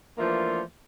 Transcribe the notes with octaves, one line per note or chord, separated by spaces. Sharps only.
E3 F3 A3 A#3 D4 F4